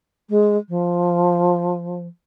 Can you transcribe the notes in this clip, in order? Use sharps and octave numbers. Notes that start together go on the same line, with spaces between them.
G#3
F3